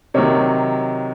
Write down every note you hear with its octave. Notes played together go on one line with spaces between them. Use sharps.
C3 D#3 F#3 C#5